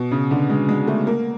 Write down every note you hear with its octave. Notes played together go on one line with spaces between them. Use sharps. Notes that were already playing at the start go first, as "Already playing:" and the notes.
Already playing: B2
C#3
D3
G#3
G#3
A3
A#3